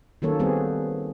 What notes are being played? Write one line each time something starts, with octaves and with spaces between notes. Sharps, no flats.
D#3 F#3 A#3 C#4 A4 C#5
G3 B3 C4 G#4